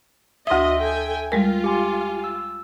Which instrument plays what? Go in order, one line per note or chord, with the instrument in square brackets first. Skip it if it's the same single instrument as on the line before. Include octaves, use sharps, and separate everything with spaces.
[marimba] D2 D#6 [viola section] F#4 D#5 [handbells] E5 C6
[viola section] A4 G5 G#5
[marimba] G3 G#3 A#4 [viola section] F4
[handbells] G4 G#5 C6
E6